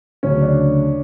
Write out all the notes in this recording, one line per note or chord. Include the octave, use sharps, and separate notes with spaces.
D2 C#3 F#3 C#4
D4